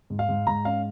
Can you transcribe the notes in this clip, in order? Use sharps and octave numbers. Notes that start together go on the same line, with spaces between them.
G#2
F5
G#2
G#2 A#5
C#4 F5